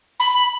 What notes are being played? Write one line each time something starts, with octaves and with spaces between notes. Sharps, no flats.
B5